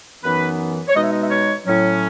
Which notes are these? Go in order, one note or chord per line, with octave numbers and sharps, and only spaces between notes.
F#2 E3 B3 D#4 B4
C#5
B2 G#3 D#4 D#5
E5
D#5
E5
C#5
A2 F#3 C#4